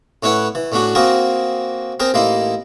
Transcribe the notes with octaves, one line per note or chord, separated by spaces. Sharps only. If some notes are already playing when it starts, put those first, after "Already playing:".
A2 C#4 E4 B4 C#5 F#5
E3
A2 C#4 D4 F#4
A#3 C4 F#4 G#4 A#4
C4 G#4 A#4 C5
A1 A#3 D#4 E4 C6